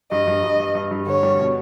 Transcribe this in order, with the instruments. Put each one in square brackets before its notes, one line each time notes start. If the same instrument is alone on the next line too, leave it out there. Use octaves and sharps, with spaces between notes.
[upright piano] G2 [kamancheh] D#5
[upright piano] G2
G2
G2
G2
G2
[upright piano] D3 [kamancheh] C#5
[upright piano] G3
B2